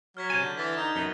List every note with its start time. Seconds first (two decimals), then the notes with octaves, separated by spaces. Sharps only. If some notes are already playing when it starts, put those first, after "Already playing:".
0.17 F#3 F6 G#6 B6
0.30 C3 C#5 G#5 G6 A6 E7
0.42 D3 E7
0.57 E3 F6 A6 B6
0.77 D#4
0.96 F#2 B3 G7